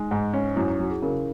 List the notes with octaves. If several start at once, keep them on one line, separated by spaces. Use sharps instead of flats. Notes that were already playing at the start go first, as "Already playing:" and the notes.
Already playing: G#3 D#4
G#2
C#4
F#2 E4
F#3
G#4
C#3 A#4